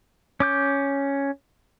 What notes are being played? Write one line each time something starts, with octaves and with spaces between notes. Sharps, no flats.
C#4 D6 G6